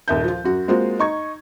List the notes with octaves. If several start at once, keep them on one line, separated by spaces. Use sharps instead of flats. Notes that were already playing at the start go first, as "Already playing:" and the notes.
D#1 D#2 E5 G6
F3 F4
F#2 F#4
G#3 A#3 C4 F4 F#4
D#4 C#6 G#6